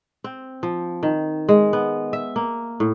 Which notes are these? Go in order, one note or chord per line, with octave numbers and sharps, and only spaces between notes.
C4
F3
D#3
G#3
B3
E5
A#3
A2